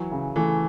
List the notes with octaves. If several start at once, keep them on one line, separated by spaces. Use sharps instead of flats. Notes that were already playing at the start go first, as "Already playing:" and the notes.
Already playing: E3 F#3
C#3
E3 A3